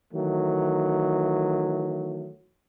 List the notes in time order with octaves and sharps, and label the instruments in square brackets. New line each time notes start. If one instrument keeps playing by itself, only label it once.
[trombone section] D#3 E3 F#3 A3